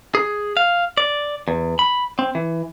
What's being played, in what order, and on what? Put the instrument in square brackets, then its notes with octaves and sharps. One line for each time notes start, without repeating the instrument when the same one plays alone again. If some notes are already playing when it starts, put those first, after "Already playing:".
[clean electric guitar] G#4
F5
D5
E2
B5
C4
E3